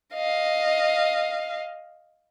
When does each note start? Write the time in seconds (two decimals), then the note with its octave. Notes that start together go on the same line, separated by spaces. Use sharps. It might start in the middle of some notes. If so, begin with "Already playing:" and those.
0.14 D#5 F5